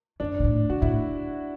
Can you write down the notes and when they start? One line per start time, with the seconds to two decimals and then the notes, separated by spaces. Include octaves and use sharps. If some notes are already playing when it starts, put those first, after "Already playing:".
0.20 F#2 D4
0.40 B2
0.44 A2
0.70 A2 F#4
0.82 A2 E4